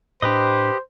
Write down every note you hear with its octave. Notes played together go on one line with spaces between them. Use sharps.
A2 D4 G4 B4 C5 D#5